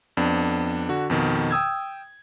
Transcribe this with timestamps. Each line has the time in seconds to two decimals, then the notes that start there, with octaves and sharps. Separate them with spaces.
0.17 F2 B3 D4
0.89 D3 F#4
1.10 F2 B2 D#3
1.51 G5 D#6 E6 G#6